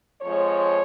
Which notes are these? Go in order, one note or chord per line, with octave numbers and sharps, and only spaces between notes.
F2 F3 G#3 C#5